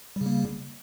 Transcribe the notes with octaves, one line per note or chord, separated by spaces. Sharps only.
C#3 G3 A#3